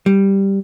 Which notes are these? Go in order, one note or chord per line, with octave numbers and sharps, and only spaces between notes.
G3